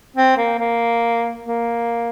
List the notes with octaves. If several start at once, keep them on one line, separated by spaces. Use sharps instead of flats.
C4
A#3
A#3
A#3